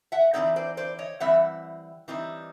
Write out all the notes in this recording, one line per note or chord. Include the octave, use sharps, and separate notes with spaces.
E5 F#5
E3 G3 C4 D#4 D5 E5
C5 D5
C5 D5
C#5 D#5
E3 G3 C4 E5 F#5
E3 G3 C4 D#4